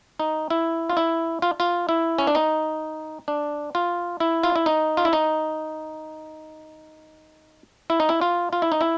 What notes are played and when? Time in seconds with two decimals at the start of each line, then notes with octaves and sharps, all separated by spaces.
0.20 D#4
0.50 E4
0.90 F4
0.97 E4
1.42 F4
1.60 F4
1.89 E4
2.18 C#4
2.27 D4
2.35 D#4
3.28 D4
3.75 F4
4.20 E4
4.43 F4
4.56 E4
4.66 D#4
4.97 F4
5.05 E4
5.13 D#4
7.90 E4
8.00 D#4
8.09 E4
8.21 F4
8.53 F4
8.62 E4
8.72 D#4
8.81 E4